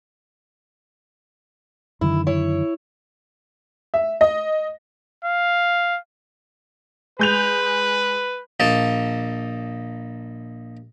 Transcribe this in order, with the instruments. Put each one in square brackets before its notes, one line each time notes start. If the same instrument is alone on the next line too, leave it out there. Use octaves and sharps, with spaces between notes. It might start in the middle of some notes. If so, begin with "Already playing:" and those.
[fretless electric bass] F#2 D3 D#3 [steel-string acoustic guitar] E4
[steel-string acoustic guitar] E4 C#5
[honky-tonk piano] E5
D#5
[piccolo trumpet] F5
[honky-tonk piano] G#3 G6 F7 [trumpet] B4
[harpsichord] A#1 A#3 D#4 A5